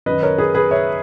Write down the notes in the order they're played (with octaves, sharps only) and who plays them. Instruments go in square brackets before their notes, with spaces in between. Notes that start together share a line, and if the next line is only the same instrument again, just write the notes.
[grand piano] F#2 D#3 B4 D#5
A#4 C#5
G#4 B4
G#4 B4
C#5 E5